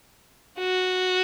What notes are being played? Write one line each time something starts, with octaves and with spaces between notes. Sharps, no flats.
F#4